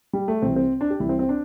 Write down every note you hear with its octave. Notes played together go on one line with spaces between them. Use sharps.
G3
A3
C2 C3 E3 C4
C4
D4
G4
C2 C3 E3 E4
C4
C4
D4